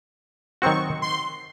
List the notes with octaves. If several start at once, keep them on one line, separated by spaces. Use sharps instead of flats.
D#3 F#3 C4 F#4 C#6
C6